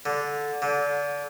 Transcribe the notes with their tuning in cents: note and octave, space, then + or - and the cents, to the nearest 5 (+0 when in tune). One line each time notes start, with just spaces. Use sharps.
D3 -10
D3 -25